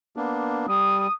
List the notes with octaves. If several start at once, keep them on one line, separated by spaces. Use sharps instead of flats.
A#3 B3 D4
G3 D#6